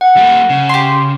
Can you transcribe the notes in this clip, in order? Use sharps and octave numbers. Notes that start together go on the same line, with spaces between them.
F#5
G3 A#3
C#3
G4 C6